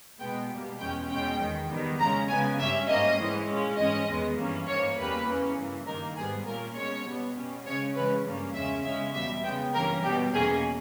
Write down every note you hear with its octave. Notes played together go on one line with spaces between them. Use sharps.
B2 G#3 B3 G5
B2 G3 A#3
E2 B2 G#3 C#4 G5
E2 B2 G#3 C#4 G5
E2 D#3 G#3
E2 D#3 G3 B3
C#3 G#3 C#4 A#5
C#3 G#3 B3 G#5
G2 G3 C#4 E5
G#2 G3 A#3 C#4 D#5
G#2 E3 G#3 C#4
A#2 G#3 C#4
G#2 E3 G#3 C#4 D#5
E2 D#3 G#3 B3
G2 E3 A#3 C#4
G#2 E3 A#3 C#5
E2 C#3 G3 A#3 C#4 B4
E2 C#3 E3 A#3 C#4
G2 E3 A#3
G2 D#3 A#3 A#4
G#2 G3 B3 G#4
A#2 A#3 C#4 A#4
B2 G#3 C#4 C#5
B2 G3 B3
B2 G3 C#4
C#3 G#3 C#4 C#5
C#3 E3 G#3 C#4 B4
G2 G3 A#3 C#4
E2 C#3 G#3 C#4 E5
E2 C#3 G#3 C#4 E5
E2 B2 G3 E5
C#3 G#3 B3 G5
G2 E3 A#3 C#4 A#4
B2 G3 B3 G4
E2 B2 A#3 C#4 G#4